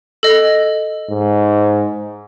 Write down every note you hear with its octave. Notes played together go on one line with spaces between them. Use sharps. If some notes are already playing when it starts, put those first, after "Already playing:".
A4 D#5
G#2